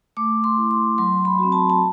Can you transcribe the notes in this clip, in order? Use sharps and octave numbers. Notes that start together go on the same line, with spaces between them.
A3 D6
C6
E4
C6
F#3 C6
B5
C4 F#4
A5
A5